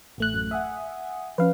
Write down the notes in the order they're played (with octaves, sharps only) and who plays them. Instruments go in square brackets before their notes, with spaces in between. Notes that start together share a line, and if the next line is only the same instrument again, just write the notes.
[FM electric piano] A1 A3 F#6
[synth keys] F#2
[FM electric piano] E5 [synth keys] F#5 G#5 D#6
[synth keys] F3 C#4 [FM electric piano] B4 F5